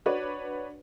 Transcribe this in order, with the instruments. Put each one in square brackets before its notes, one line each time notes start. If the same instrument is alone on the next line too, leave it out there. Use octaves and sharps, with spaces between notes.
[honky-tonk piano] D4 F#4 B4 C#5 D5